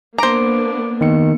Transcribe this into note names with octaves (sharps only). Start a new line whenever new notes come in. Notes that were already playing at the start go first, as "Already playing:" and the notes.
A#3 B3 D4 C5 A#5 D6 D7
D#3 A#3 B3 C#7